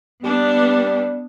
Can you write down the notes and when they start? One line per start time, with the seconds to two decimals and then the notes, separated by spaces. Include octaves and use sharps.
0.24 G3 B3 D4